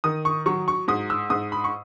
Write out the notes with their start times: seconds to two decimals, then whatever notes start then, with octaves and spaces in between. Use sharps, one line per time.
0.04 D#3 D#6
0.25 C#6
0.46 F#3 C#6
0.68 C#6
0.88 G#2 D#6
1.10 E6
1.30 G#2 D#6
1.52 B5
1.64 C#6